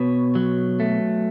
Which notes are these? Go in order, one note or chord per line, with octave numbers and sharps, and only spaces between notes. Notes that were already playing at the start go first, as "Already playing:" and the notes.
Already playing: B2 B4 C#5
F#3
A3